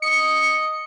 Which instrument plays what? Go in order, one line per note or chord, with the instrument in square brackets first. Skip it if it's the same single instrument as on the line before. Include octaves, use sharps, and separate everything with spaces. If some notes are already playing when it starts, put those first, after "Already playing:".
[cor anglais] D#5 [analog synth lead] C#7